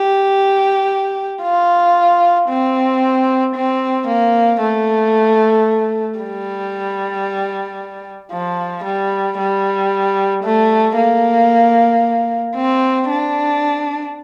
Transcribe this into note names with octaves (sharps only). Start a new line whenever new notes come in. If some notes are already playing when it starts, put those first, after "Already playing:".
Already playing: G4
F4
C4
C4
A#3
A3
G3
F3
G3
G3
A3
A#3
C4
D4